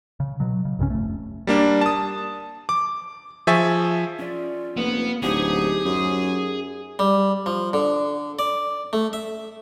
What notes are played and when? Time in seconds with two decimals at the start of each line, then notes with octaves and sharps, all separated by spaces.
0.20 C#3
0.40 B2 F#3
0.65 C#3
0.79 C2 G2 C#3 C#4
0.90 F1 A3
1.47 G3 A#3 D4
1.81 A5 D#6
2.69 D6
3.47 F3 G#4 E5 G#5 C#6 A6
4.19 C#4 F4 D5
4.77 F1 A#3 B3
5.23 D1 D#4 G4 G#4 C5 F#5
5.85 F#2
6.99 G3
7.46 F3
7.73 D3
8.39 D5
8.93 A3
9.13 E5